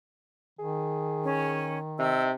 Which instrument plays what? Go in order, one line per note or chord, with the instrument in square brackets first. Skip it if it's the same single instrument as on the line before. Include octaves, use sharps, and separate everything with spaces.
[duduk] D#3 [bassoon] G#4
[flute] C#4
[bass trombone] C3 [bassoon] D#4 [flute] E6